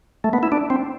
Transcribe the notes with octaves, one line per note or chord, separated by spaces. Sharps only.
A3
B3
E4
D4
C4